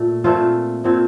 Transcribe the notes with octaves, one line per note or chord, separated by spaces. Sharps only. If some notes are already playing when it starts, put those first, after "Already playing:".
Already playing: A#2 A3
A#2 A3 C4 F4
A#2 A3 C4